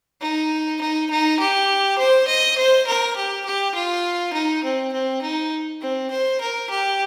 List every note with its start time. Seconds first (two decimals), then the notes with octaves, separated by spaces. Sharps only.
0.21 D#4
0.81 D#4
1.10 D#4
1.40 G4
1.98 C5
2.28 D#5
2.58 C5
2.87 A#4
3.16 G4
3.45 G4
3.75 F4
4.34 D#4
4.64 C4
4.93 C4
5.22 D#4
5.81 C4
6.11 C5
6.41 A#4
6.70 G4